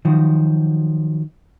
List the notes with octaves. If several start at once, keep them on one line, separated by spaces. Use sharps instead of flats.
D#3 F3 F#3 F#4